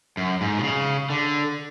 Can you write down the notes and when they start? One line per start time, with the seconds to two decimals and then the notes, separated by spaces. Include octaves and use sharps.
0.17 F#2
0.41 G#2
0.59 B2
0.63 C#3
1.10 D3